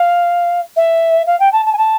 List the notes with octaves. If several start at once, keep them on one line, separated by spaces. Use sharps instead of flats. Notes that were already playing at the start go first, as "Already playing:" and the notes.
Already playing: F5
E5
F5
G5
A5
A5
G#5
A5